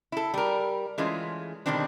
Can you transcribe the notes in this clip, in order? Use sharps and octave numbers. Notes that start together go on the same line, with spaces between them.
E4 A4
G3 A#4
E3 G#3 A3 C#4 F4
B2 D3 D#3 G3 C4 D4